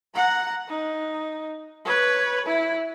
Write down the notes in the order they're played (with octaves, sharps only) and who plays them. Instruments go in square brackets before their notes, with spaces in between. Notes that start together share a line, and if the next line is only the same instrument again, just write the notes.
[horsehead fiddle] F#5 A#5
D#4
B4 C#5
E4